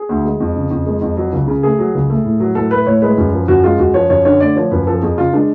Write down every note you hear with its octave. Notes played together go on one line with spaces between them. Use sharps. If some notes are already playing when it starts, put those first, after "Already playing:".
Already playing: G#4
D2
G#3
F2
C#3
F2
G#3
F2
F#3
C#2
C#3
A3 G#4
F#3
C#2
A3
A2
F#3
A2 A4
A3 B4
A2 C#5
G#3 B4
F#2
F3
F#2 F#4
G#3 F4
F#2 F#4
F3 C#5
F#2 C#5
D3 C#5
A3 D5
F3 C#5
F#2 B4
F3 A4
F2 G#4
C#3 F4
G#3 D4